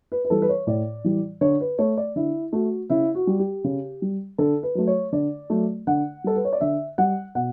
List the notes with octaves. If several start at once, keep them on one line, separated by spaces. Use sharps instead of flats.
B4
B4
E3 G3 A4
B4
C#5
A2 D5
E3 G3
D3 C#5
B4
A3 C#5
D5
D3 E4
A3 F#4
C#3 E4
F#4
G3
G4
C#3
G3
D3 A4
B4
F#3 A3
C#5
D3 D5
F#3 A3
D3 F#5
G3 A4
B4
C#5
D5
D3 E5
G3 F#5
B2 F#5